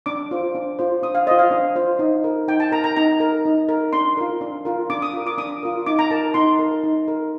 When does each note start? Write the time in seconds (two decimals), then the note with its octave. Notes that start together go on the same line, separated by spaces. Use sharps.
0.06 D4 D6
0.31 F4 C5
0.55 D4
0.79 F4 C5
1.03 D4 D#6
1.15 F5
1.27 F4 C5 D#5
1.39 F5
1.51 D4
1.76 F4 C5
1.99 D#4
2.24 A#4
2.48 D#4 G5
2.60 A5
2.72 A#4 A#5
2.84 A#5
2.97 D#4 A#5
3.20 A#4
3.45 D#4
3.69 A#4
3.93 D4 C6
4.17 F4 A#4
4.41 D4
4.65 F4 A#4
4.90 D4 D6
5.02 D#6
5.14 F4 A#4
5.27 D6
5.38 D4 D#6
5.63 F4 A#4
5.86 D#4 D6
5.99 A#5
6.10 A#4 A5
6.34 D#4 C6
6.59 A#4
6.84 D#4
7.08 A#4